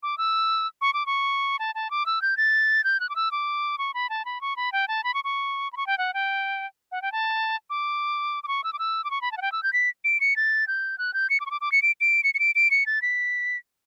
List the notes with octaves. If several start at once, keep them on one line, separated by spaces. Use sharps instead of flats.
D6
E6
C#6
D6
C#6
A5
A5
D6
E6
G6
A6
G6
F#6
D6
E6
D6
C#6
B5
A5
B5
C#6
B5
G5
A5
B5
C#6
C#6
B5
C#6
G5
F#5
G5
F#5
G5
A5
D6
D6
C#6
E6
D6
E6
D6
C#6
B5
A5
F#5
G5
E6
G6
B6
D7
C#7
A6
G6
F#6
G6
C#7
D6
C#6
D6
D6
C#7
D7
D7
C#7
C#7
D7
D7
C#7
A6
B6